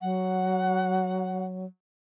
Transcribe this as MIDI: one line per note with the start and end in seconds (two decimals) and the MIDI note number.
0.01 1.66 54
0.01 1.45 78